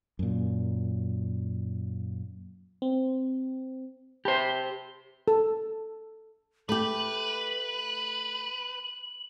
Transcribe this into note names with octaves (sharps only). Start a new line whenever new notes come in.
F#2 A#2
C4
G4 C5 A5 B5
A4
A3 G4 B4 F#7